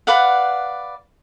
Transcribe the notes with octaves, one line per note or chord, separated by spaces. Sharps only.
B4 D5 F5 F#5